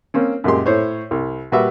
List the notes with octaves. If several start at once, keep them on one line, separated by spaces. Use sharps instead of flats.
A#3 C4 C#4
F#2 A#2 G#3 G4 C6
A2 C5 C#5
C2
A#2 G3 F#4 G4 B4 E5